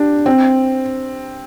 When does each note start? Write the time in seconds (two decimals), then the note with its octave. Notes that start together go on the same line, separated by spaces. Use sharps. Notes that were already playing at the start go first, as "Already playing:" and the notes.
Already playing: D4 G4
0.26 C4